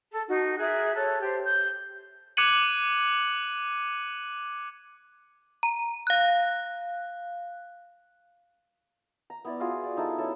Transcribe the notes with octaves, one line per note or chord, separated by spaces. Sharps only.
A4
D#4 F#4
G#4 A#4 E5 F#6
A4 C#5 F#6
G4 C5
G6
D6 F#6 G#6 C#7 D#7 F#7
A#5
F5 F#6
A#5
B3 E4 D5
F4 F#4 G#4
D5
D#4 E4 A4
C#4 E4 A4